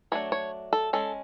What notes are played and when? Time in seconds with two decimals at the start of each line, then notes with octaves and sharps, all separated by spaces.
0.12 F#3 A3 D4 C#5
0.32 C#5
0.73 A4
0.93 G#3 C#4 A4